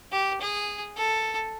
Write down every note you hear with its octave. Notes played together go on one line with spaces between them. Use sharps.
G4
G#4
A4